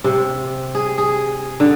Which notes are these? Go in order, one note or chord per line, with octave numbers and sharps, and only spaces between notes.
C3
G#4
G#4
D3